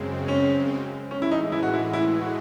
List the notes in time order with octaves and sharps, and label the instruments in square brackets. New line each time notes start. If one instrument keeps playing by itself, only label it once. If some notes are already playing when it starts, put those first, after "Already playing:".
Already playing: [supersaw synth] F#2 C#3 G#3 C4
[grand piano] C#4
[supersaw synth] A2 E3 G#3 [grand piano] C#4
[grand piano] E4
D#4
E4
F#4
E4
E4
F#4